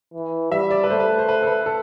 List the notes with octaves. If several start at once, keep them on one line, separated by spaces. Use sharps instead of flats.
E3
G3 E5
D5
B4
A3 C5
B4
C5
B4
A4
B4
A4